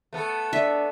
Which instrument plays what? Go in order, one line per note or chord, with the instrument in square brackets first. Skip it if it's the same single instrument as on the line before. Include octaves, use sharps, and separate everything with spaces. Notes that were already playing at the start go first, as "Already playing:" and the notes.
[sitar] A3 B3 A4
[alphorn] D4 [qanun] E5